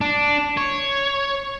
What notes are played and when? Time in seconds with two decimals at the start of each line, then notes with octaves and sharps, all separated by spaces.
0.01 D4
0.57 C#5